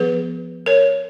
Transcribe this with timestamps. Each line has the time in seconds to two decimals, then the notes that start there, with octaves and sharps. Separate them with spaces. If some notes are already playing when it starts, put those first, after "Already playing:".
Already playing: F3 B3 G#4 B4
0.66 A#4 C#5